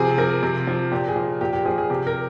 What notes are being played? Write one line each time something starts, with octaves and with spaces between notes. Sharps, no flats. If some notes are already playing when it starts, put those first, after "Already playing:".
Already playing: C3 F3 G#4
F3 A#4
C3
F3
A#2 G4
G#4
F3
A#2 G4
G4
F3 G#4
G#4
C3 G4
A#4